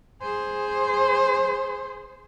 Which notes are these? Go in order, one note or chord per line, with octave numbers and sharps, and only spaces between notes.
G#4 C5